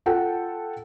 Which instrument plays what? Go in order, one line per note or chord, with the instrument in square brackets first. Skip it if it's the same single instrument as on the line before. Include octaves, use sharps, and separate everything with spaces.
[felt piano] F4 A4 F#5 G5